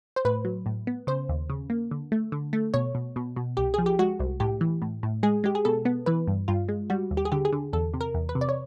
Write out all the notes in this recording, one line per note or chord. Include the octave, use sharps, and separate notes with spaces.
C5
A2 B4
F#3
A2
B3
C#3 C5
D#2
C#3
A#3
D3
A3
D3
A3
B2 C#5
B2
B2
B2
C2 G4
F3 G#4
G4
G#3 F#4
C2
A2 G4
E3
A2
A2
G#3 G#4
G#3 G4
G#4
B2 A4
B3
E3 B4
G2
G2 F4
G#3
G3 F#4
D#2
G4
G#4
D3 G4
G#4
D3
E2 A4
C3
A#4
E2
B4
C3
D5
C#5